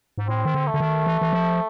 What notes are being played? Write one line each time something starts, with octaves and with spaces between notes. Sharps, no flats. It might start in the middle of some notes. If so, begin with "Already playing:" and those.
G#2
A2 C4
D#3
D3
A3
D3
D#3
E3
E3
F3